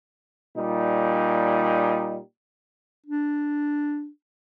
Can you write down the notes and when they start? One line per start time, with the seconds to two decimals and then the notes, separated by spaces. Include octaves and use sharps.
0.56 A#2 G3 D#4
3.06 D4